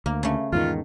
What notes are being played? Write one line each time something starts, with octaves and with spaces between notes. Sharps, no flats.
D2 A#3
C#3 A3
E2 G#2 D#3 F4